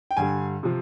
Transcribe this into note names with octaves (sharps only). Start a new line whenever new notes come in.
G5
G2 D3 G3 G#5
C3 F3